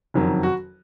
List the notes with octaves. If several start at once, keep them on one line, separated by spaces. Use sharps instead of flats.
F#1 F2 D#3 F#3
F#4